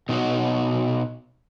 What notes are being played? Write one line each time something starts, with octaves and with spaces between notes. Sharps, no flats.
B2 D#4 F#4 C#5